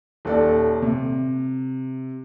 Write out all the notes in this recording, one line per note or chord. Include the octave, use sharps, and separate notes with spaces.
D#1 A4 D5
C3